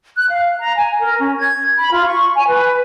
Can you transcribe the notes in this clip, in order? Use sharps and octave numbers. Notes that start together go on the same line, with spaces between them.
F#6
F5
A#5
G#5
A#4
C#4
G#6
B5
F4
C#6
G#5
B4